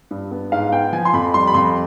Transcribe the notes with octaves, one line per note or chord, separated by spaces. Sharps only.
G2
B3
G#2 F5
B3 G5
F3 G#5
C6
F2 B5
G3 C6
B5
F2 C6